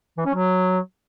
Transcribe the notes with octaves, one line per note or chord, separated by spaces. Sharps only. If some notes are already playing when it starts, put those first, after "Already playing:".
E3
C#4
F#3